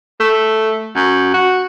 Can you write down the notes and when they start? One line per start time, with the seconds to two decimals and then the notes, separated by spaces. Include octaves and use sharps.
0.20 A3
0.96 F#2
1.34 F#4